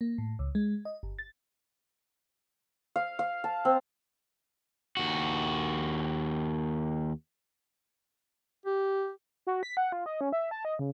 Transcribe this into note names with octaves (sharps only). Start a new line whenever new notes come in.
A#3
A2
C#2
G#3
D#5
G1
A6
F5
F5
A5
C4
D#2 F#4
G4
F#4
B6
F#5
F4
D#5
C#4
E5
A5
D#5
C#3